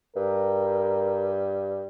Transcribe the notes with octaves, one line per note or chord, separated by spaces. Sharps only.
G2 A#4